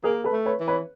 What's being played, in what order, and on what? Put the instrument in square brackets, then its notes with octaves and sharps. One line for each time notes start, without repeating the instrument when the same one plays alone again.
[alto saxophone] A#3 [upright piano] G#4 A#4
[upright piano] A4 B4
[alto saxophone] A3
[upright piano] B4 C#5
[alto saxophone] E3
[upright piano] B4 C#5